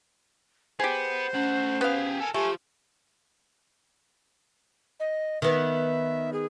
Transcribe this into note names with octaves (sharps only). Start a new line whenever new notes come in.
B3 G4 G#4 C5
A3 C#4 F#5
B3 G4 G#4 F5
A4 A#4 G#5
F3 A3 G4 G#5
D#5
D#3 B3 E5
G#4